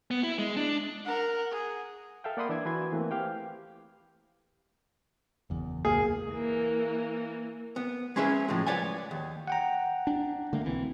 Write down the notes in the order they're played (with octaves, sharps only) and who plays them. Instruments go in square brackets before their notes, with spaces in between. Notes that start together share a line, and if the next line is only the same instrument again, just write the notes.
[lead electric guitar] B3
E4
G#3
D4
[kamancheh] A#4 F#5
G#4
[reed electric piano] A4 E5 F5 G5
A#3 D5 F#5 B5 C6 D#6
E3 D4 E5 D6 G#6
E3 F#4 B4 C6 G#6
E3 A3 A#3 C4
G4 F5 G5
[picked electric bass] F#1 E2
[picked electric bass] D1 C#2 A#3 [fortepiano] G#4
[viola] E3 A#3
[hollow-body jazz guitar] B3
G#3 C#4 G#4 B4 D#5 E5
A2 F3 F#3 G#3
B4 C#5 D5 F#5 G#5
D#2
[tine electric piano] F#5 G5 A#5
[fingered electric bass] D4
D3 A3 A#3
B1 E3 C4